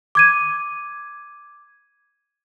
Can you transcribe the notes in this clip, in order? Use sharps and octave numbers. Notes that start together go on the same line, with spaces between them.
D6 G#6 D#7